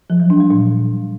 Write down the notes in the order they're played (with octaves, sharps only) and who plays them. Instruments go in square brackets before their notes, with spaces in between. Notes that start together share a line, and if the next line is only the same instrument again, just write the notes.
[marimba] F3
F#3
D4
G3
A#2